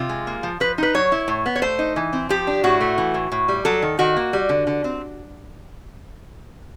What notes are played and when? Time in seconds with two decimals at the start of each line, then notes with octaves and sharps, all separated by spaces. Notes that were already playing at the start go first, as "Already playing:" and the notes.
Already playing: C3 F4
0.09 G#3
0.27 A#3
0.43 F3
0.60 F3 B4
0.78 D#4 B4
0.94 F#3 C#5
1.12 E4
1.28 A2
1.46 B3
1.56 C#5
1.62 A3 C5
1.79 D#4
1.96 E3
2.13 C4
2.29 F3 G4
2.47 D4
2.64 A2 F#4
2.81 A3
2.98 E3
3.14 A2
3.32 A2
3.48 G3
3.65 F#3 A4
3.82 D#3
3.99 D#3 F#4
4.16 A#3
4.33 G3
4.49 D3
4.67 D3
4.84 C4